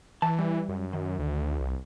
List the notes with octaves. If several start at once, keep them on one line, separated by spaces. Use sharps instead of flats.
E3 A5
G3
F#2
D#3
D2
C2